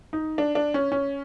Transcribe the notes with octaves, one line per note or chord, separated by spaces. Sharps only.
D#4
D4
D4
C#4
C#4